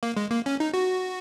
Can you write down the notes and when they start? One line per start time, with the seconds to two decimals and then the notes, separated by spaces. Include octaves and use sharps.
0.03 A#3
0.17 G#3
0.31 A#3
0.46 C#4
0.60 D#4
0.74 F#4